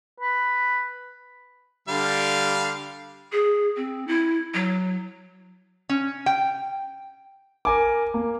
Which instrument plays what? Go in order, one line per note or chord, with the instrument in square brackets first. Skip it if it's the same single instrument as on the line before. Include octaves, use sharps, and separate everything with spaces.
[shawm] B4
[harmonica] D3 G3 F5
[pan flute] G#4
C4
E4
F#3
[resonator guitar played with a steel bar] C#4
G5
[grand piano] A#4 G#5 D6
A#3